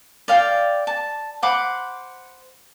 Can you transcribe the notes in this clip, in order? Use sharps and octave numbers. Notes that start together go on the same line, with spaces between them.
D5 F5 G5
A5
C5 F#5 B5 D6